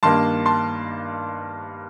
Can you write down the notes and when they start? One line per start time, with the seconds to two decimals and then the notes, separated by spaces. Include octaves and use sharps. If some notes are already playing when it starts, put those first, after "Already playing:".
0.03 G2 D#3 A#3 A5 C6
0.46 A5 C6